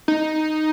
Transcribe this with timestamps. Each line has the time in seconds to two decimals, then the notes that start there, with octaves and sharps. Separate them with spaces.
0.08 D#4